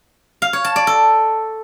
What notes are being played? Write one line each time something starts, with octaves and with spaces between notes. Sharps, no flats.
F5
C#5
A5
D5
A4